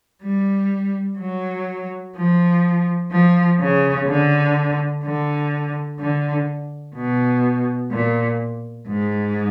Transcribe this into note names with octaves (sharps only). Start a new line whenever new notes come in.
G3
F#3
F3
F3
C#3
D3
D3
D3
B2
A#2
G#2